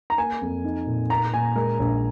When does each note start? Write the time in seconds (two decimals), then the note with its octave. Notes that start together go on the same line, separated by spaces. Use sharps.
0.10 A#5
0.18 A#3 G#5
0.42 F2
0.64 D#4
0.87 A#2
1.10 A#3 A#5
1.33 A#2 G#5
1.56 G#3 A#4
1.80 A#1